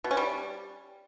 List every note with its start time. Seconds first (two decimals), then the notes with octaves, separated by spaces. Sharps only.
0.04 B2
0.11 C#4
0.17 G3